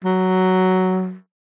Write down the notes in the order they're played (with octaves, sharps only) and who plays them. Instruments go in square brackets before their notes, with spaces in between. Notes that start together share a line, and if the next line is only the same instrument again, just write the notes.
[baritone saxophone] F#3